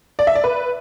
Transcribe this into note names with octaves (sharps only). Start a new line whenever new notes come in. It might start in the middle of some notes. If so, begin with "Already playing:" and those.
D5
E5
D5
B4